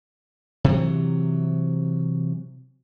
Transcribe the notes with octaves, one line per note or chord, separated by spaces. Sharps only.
C3 E3 F#3